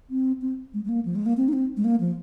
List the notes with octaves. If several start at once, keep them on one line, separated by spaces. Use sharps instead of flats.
C4
C4
G#3
G#3
A#3
F3
G#3
A#3
C4
D#4
C4
G#3
A#3
F3